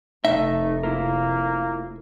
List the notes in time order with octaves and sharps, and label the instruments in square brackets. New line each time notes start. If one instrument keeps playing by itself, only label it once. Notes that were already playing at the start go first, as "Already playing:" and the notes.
[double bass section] F1 [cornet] A3 [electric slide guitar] D#4 [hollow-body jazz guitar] E5
[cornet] A#3 [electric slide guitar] E4 F4 A#4